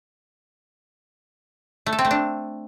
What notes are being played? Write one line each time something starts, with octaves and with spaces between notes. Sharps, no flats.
A3
A4
C4
A3
D4